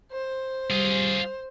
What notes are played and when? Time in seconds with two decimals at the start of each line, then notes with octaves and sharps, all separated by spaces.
0.12 C5
0.71 G3 F4 G#4